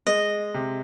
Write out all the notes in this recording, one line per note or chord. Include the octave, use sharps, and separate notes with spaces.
G#3 D#5
C3